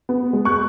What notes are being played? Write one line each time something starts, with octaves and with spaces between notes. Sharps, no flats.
B3
G#3
C#6 F#6